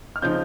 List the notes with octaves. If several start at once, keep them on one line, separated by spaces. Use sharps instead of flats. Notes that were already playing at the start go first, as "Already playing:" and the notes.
F6
C#3 F3 C4 D#4 G6